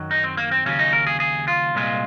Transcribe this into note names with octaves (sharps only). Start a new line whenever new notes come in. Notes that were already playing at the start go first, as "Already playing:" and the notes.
Already playing: F#2 D#3 F#3
D#4
C4
A#3
C4
D#2 C#3 F#3 C#4
D#4
A#4
G#4
G#4
F4
C2 A#2 G#3